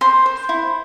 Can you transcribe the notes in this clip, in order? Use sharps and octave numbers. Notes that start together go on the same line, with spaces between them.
C5 C6
C5
E4